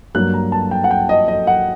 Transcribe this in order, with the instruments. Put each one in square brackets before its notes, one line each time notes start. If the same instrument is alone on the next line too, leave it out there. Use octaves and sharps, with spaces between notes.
[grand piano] G2 F#3 A#3 F#6
A#5
A5
G5
F#5
G5
D#5
D#5
F#5